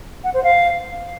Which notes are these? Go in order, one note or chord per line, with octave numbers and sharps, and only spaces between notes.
F#5
C5
F5